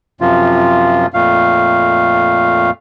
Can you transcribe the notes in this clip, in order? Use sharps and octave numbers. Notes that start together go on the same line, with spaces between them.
F#2 C3 F3 F4
F2 A#2 A3 F5